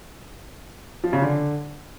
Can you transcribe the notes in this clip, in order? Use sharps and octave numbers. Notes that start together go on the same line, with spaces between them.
F3
C#3
D3